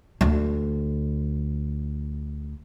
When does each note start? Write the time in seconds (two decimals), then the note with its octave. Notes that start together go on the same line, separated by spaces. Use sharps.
0.21 D2 D3